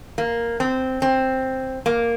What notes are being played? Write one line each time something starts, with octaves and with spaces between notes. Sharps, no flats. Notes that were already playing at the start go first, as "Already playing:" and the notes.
A#3
C4
C4
A#3